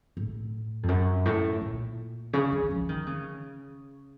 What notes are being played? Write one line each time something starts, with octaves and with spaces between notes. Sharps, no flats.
A2
F2
F#2
A2
A#2
C#3
D#3
F3
D#3
C#3